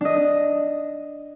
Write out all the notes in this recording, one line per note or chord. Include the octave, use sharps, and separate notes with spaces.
D4 D#5